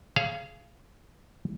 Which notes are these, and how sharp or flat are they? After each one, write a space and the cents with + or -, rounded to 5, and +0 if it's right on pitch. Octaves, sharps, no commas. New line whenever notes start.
G#4 +25 C#5 -15 F5 -20